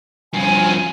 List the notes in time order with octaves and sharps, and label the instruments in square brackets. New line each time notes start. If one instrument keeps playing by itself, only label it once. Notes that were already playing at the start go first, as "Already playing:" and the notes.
[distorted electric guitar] G2 F3 [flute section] G#5